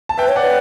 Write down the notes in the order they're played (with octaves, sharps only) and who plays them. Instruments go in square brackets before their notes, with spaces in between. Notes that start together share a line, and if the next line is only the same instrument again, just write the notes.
[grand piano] A5
[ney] B4 [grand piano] E5 G5
[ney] C#5
[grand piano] D5 F#5
[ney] B4